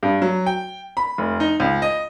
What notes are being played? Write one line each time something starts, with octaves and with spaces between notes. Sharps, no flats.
G2
F#3
G5
B5
F1
D#4
C#2
D#5